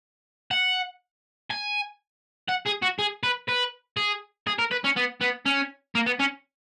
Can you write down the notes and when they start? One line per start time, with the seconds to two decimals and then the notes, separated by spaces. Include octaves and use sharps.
0.51 F#5
1.50 G#5
2.48 F#5
2.66 G#4
2.82 F#4
2.99 G#4
3.23 B4
3.48 B4
3.97 G#4
4.47 G#4
4.58 A#4
4.71 B4
4.84 C#4
4.96 B3
5.21 B3
5.46 C#4
5.95 A#3
6.06 B3
6.20 C#4